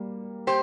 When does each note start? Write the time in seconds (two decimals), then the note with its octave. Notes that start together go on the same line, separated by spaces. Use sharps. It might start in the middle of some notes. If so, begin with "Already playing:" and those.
Already playing: G3 A#3
0.47 G4 C5